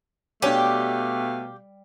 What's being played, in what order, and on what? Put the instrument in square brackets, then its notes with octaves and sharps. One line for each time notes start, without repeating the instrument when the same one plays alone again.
[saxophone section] B2 A3 F5 [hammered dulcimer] G3 [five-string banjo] D4 C#5 G#5 [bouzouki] G4